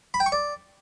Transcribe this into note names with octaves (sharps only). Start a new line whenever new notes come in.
B5
G5
C#6
D5